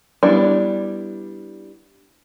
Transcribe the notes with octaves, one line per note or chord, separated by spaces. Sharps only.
G3 B3 D4 E4 D5